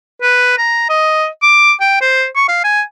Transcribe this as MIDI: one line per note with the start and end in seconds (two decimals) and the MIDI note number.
0.22 0.55 71
0.58 0.86 82
0.89 1.26 75
1.43 1.73 86
1.81 2.00 79
2.01 2.26 72
2.36 2.47 85
2.48 2.64 77
2.64 2.82 80